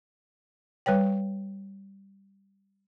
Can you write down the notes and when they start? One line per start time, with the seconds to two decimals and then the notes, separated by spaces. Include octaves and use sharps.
0.86 G3 B4 C#5 G5